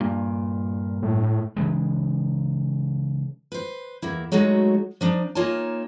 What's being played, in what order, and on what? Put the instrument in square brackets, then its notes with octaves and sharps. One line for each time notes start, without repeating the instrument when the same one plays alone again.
[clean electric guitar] G2 A#2
[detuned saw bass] A2
[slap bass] C#3 E3 G#3
[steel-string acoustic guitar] B4 C5
E2 A#3 E4
F#3 G#3 A3 D#4 F#4
F3 D4 D#4
A#3 D#4 F4 C#5 G#5 A5